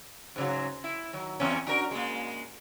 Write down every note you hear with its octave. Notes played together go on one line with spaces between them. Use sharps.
G#2 C#3 F#3
E4
D#3 F#3
E2 E3 C#4
D4 F#4 A#4
G#3 A#3